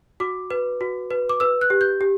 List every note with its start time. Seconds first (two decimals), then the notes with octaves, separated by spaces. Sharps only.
0.20 F#4 D6
0.50 B4
0.81 F#4
1.11 B4
1.29 D6
1.40 B4 E6
1.61 F#6
1.70 G4
1.81 G6
2.01 G4